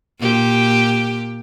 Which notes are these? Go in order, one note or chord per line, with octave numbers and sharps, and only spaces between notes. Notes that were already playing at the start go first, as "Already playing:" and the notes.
A#2 G4